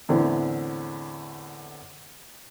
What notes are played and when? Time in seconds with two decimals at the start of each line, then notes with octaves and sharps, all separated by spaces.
0.09 E2 A2 D3 C4